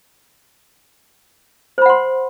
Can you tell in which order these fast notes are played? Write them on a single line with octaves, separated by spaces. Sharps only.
C5 B5 F#5 C6